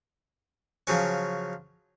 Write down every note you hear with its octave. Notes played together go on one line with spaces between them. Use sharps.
C#3 F3 F#3 C#4